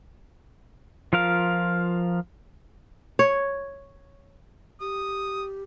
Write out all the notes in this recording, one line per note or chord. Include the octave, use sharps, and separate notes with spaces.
F3 F4 A#4 F5
C#5
G4 D#6